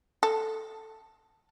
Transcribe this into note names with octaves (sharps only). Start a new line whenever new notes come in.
A4